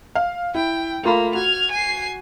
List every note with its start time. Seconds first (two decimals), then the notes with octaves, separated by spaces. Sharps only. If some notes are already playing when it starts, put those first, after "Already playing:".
0.15 F5
0.55 E4 G5
1.03 A3 A#3 F4 B5
1.35 F#4 F6 G#6
1.71 G#5 C7